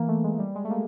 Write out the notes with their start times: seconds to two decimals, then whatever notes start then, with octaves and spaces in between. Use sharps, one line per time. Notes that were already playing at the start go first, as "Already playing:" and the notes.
Already playing: E3 A#3
0.08 A3
0.24 G#3
0.39 G3
0.55 G#3
0.65 A3
0.71 A#3